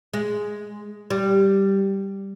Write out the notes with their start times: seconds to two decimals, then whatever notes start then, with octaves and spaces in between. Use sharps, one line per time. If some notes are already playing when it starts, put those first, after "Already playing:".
0.13 G#3
1.10 G3